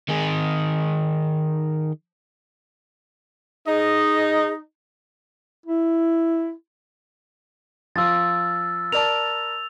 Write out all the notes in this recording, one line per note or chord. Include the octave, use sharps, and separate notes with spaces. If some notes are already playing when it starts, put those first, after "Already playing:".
D#3 G#4
D#4 G#4 D#5
E4
F3 F4 E6 A6
A#4 D5 A5 F7